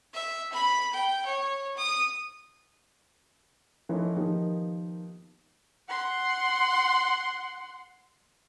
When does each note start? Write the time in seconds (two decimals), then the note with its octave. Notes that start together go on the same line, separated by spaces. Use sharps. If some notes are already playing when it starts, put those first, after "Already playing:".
0.14 E5
0.53 B5
0.94 G5
1.26 C#5
1.77 D#6
3.89 E3 F3 A3 C#4 D#4 E4
4.16 D#3 F3 A#3 B3 D#4 G4
5.88 F#5 C6